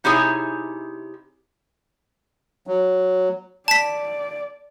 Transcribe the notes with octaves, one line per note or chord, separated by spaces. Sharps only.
C3 D#4 E4 G#4 C#5 G#5
F#3
D5 A5 B6